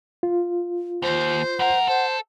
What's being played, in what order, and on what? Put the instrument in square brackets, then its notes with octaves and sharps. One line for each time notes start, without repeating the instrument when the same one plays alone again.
[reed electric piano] F4
[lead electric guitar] D#2 [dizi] C5
[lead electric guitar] F#2 A#4 [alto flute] F#5
[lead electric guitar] A4 [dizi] C5